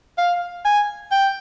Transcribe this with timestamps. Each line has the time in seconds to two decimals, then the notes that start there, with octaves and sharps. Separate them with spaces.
0.18 F5
0.65 G#5
1.12 G5